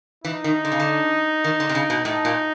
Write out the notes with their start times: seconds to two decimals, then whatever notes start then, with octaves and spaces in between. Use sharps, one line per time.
0.24 E3 D#4
0.44 D#3
0.65 D3
0.72 C#3
0.80 D3
1.44 D#3
1.60 D3
1.69 C3
1.75 C#3
1.90 B2
2.05 A2 D#4
2.25 A#2